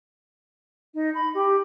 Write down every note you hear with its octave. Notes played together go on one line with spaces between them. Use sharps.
D#4
B5
G4